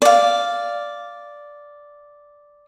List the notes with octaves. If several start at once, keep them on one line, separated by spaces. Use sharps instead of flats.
D5 F5